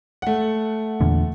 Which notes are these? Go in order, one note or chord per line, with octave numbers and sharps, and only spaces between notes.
A3 F#5
E2 A#2 D3